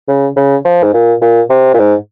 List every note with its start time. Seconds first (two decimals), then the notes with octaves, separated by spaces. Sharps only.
0.08 C#3
0.36 C#3
0.65 F3
0.83 G#2
0.94 A#2
1.22 A#2
1.50 C3
1.74 A#2
1.79 G#2